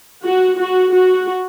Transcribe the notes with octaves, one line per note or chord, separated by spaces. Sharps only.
F#4
F#4
F#4